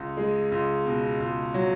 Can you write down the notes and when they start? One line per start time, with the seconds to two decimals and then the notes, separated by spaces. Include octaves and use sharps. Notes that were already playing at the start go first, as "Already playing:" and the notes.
Already playing: C#2
0.17 G#3
0.51 C#2
0.85 B2
1.20 C#2
1.54 F#3